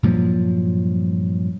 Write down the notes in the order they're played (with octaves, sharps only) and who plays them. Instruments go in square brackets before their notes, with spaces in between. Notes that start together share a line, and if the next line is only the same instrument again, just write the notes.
[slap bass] G2 A#2 F3 F#3